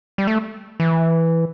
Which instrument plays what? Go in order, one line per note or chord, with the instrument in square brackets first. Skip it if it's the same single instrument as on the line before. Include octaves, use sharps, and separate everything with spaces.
[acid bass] G3
A3
E3